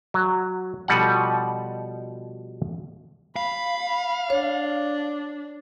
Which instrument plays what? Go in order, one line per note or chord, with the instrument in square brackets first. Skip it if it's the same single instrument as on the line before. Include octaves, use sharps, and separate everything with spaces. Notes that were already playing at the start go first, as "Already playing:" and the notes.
[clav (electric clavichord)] F#3
B2 F3 G3 A4 D#5 F#5
[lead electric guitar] F5 [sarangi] B5
[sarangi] D4 [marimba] C#5